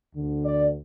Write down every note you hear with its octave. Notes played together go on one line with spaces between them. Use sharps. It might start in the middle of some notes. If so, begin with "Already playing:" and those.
D2 D3
D5